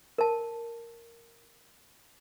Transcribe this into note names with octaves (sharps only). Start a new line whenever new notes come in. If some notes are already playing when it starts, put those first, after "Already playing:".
A#4 A5